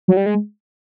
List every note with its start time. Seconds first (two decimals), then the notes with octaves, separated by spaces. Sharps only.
0.08 F#3
0.17 G3
0.26 G#3